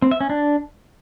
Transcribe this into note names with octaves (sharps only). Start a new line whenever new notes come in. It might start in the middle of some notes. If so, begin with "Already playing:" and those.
C4
E5
C#4
D4